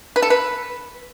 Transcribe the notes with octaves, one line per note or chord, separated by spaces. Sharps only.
B4
A4
B4